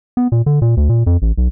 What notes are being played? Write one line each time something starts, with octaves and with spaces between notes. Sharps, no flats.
B3
A#2
D3
A#2
D2
A#2
F2
A1
B1